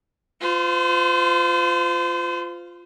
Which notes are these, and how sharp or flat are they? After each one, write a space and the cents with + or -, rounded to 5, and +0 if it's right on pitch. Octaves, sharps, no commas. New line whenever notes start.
F4 +0 C5 -35